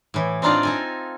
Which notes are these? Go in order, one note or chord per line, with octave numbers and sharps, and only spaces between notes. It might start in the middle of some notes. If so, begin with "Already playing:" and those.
A2 E3
C4 D4 D#4 F4 D5 D#5
D#4 A4 G#5